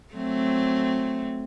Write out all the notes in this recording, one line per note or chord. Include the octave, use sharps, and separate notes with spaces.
F#3 A3 C4